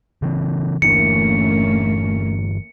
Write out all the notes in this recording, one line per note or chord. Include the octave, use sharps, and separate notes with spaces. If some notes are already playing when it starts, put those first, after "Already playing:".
C#3 E3 C4
G1 E3 A3 A#3 C#4 D4 C#7